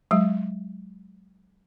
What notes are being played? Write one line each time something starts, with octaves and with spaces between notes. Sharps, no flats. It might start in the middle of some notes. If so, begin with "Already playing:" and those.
F#3 G#3